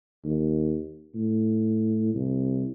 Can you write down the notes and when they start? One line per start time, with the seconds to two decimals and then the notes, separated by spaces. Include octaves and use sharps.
0.24 D#2
1.16 A2
2.14 C2